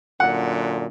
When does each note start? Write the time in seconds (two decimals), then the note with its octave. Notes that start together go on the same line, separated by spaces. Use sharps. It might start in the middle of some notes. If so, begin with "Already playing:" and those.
0.20 F#2 A#2 D3 F#5